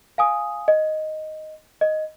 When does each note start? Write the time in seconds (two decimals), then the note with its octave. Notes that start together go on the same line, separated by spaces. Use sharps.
0.18 F5 G#5 D#6
0.68 D#5
1.81 D#5